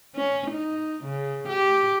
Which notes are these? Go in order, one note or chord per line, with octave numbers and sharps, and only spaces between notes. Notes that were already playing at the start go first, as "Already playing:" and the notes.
C#4
D#4
C#3
G4